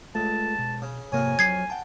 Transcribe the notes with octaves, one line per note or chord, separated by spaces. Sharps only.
C#2 A3 F4 A4 A5
B2
C#3
F2 G#2 C3 A#3 A#4 C#5 G#5
F#3 G#6 C7
F#5 G5 A5